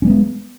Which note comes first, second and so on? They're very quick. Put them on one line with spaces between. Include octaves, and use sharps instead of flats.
C#4 G3 B3 G#3